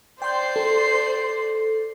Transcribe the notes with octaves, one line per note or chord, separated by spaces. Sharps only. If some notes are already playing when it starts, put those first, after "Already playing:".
C5 D5 G5 C6 G6 C7
A4